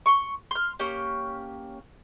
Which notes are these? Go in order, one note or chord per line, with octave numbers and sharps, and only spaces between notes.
C6 C#6
C6 F6
A#3 C#4 G4